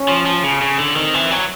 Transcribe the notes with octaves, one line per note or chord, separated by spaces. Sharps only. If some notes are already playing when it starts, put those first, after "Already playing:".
Already playing: C#4
F3
F3
C#3
C#3
D3
D#3 C4
E3
F#3